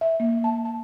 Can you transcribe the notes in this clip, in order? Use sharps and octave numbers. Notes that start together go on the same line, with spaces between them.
E5
A#3
A5
A5